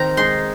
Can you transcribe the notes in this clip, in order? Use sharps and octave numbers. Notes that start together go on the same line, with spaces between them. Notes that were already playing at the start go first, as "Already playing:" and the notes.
Already playing: D#3 C4 A#5
G#3 D#4 C6